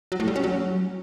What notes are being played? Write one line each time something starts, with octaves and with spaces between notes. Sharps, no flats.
F#3
A2
G3
C#4
F#3